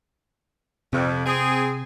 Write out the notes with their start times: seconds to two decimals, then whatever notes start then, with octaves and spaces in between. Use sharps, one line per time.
0.93 F2 C3
1.26 C4 G#4